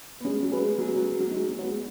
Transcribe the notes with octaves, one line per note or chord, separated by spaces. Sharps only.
B3
G#3 C#4
F#3
G#4 B4
G#3
F#3 C#4
F#3
G#4 B4
F#3
G#3 D#4
F#3
B3 F#4 C#5 F#5
G#3